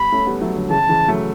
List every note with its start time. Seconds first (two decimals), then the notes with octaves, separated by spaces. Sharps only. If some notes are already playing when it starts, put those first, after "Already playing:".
Already playing: G3 B3 B5
0.12 A3 C#4
0.27 G3 B3
0.41 F#3 A3
0.55 D3 F#3
0.70 C#3 E3 A5
0.89 C#3 E3
1.08 F#3 A3